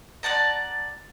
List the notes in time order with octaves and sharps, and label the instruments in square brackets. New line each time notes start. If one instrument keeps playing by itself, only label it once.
[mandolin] D5 F#5 A5 A#5